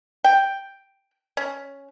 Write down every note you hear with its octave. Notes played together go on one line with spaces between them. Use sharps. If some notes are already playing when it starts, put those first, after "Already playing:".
G5
C#4